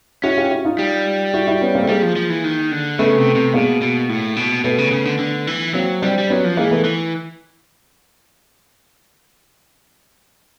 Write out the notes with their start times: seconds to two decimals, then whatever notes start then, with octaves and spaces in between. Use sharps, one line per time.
0.23 C#4 E4 F#4
0.37 F4 G4
0.51 E4 F#4
0.65 D#4 F4
0.79 G3
1.33 E4 F#4
1.47 E4 F#4
1.61 B3 C#4
1.75 A#3 C4
1.83 A3
1.89 G3 G#3 A#3
2.02 F3
2.16 F3
2.30 E3
2.44 D#3
2.71 D3
2.99 C#3 A3 B3
3.17 C3
3.35 C3
3.54 B2 G#3 A#3
3.82 B2
4.09 A2
4.36 B2
4.64 B2 A3 B3
4.78 C#3
4.92 C#3
5.05 D3
5.19 D3
5.47 E3
5.74 F#3 A#3 C4
6.02 G3 C4 D4
6.18 G3
6.30 F#3 B3 C#4
6.44 F3
6.57 E3 G#3 A#3
6.71 A3 B3
6.85 E3